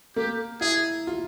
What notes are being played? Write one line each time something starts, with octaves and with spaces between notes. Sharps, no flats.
A#3 G4
E4 G#4
F4